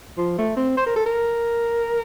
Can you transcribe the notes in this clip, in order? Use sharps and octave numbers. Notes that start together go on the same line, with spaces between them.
F3
A3
C4
C5
A#4
A4
A#4